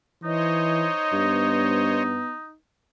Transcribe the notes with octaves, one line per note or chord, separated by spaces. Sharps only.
E3 D#4 C5 C#5 D#5
G2 B3